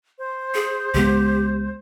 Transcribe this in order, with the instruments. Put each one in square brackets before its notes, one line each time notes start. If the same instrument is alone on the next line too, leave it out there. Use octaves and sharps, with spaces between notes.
[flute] C5
[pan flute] G#4
[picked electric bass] C#2 G#3 B3 [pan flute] G4